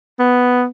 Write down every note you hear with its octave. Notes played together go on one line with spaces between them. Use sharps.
B3